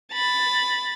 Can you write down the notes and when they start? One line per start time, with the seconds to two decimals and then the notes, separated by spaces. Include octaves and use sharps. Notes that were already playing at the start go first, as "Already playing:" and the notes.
0.12 B5 A6